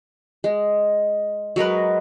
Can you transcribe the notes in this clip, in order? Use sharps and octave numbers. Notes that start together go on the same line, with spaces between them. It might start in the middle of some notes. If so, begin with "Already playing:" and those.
G#3
F#3 G#3 A#4 B4